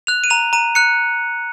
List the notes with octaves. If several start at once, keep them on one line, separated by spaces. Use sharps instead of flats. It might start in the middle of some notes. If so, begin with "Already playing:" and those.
F#6 F7
D#7
A#5 F7
A#5 D#7
F#6 C#7